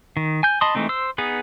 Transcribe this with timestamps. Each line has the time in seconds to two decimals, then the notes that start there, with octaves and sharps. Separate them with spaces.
0.17 D#3
0.43 G#5 G6
0.61 D#5 A5 B5 C6 D#6
0.75 E3 G#3 A3 C4 D#4
0.89 C5 E6
1.18 B3 D#4 G#4 B4